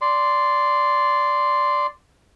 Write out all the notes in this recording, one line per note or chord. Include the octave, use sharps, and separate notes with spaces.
D5 C6